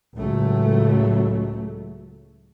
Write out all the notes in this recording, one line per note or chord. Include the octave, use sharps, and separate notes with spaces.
C#2 A2 F#3 A3